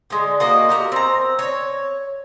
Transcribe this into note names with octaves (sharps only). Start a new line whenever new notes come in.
D3 G#3
A#3 F#4 D#5
F#4 G4 A#4
C4 A#5
C#5